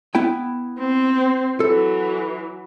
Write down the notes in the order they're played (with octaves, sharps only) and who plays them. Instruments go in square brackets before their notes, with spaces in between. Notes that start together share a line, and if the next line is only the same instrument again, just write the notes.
[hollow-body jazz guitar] B3 E4 G5
[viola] C4
[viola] E3 F#3 [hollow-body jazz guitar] A4